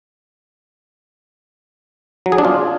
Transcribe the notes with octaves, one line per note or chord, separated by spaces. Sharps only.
F#3
G#4
D4
F4